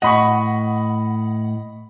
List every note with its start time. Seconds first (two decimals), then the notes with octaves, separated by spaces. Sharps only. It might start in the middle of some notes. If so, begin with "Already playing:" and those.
0.02 A2 D#5 F#5 B5 C#6